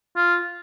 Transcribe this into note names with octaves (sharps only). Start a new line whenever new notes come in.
F4